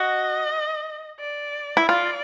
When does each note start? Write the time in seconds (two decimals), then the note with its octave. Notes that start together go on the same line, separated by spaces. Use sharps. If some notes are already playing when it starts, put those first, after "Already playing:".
Already playing: F#4 D#5
1.20 D5
1.77 E4
1.88 F4 D5